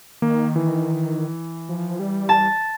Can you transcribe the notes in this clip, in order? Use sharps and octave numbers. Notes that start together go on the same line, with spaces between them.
D#3 A#3
E3
F3
G3
A5